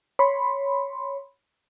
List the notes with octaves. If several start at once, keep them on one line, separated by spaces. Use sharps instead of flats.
C#5 B5 C6